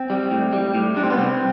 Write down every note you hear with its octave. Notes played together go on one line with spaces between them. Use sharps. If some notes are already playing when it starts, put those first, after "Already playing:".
Already playing: C4
G3
A2
G3
A2
G3 D4
C4
B3
C2 C4